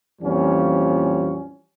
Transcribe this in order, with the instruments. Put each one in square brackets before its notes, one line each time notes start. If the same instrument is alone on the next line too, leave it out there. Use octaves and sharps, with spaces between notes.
[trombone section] F2 A#2 E3 F3 G3 C#4